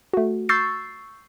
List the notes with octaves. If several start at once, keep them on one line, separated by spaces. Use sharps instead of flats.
A3 F#4
C#6 E6 G6 A6 C7